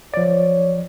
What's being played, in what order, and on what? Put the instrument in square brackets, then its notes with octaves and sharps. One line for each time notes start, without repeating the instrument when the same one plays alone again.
[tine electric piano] F3 D5 [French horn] C#5